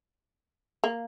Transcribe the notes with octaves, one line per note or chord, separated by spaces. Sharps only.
A#3